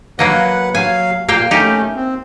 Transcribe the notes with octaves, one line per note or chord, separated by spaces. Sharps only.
F#3 A#3 B4 D#5 F#5
F#3 F5 G#5
A#2 A#3 F5 G5
A3 C#4 D#4 G4
C4